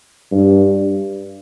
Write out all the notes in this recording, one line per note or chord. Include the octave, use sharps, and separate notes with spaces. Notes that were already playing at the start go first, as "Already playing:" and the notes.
G2